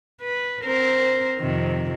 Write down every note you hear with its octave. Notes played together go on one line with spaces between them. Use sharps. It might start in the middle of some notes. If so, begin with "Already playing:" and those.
B4
C4 A#4 C5
F2 C3 D#3